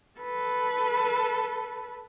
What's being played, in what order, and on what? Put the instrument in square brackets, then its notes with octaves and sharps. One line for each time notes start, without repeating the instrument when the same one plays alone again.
[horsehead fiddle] A4 B4